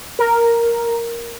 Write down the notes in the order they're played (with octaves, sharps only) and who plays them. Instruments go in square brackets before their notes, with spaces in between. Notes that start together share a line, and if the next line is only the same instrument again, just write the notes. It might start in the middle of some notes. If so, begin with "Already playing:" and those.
[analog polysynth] A#4